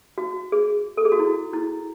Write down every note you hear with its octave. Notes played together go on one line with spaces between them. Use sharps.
F#4
G#4
A4
G#4
F#4
E4
E4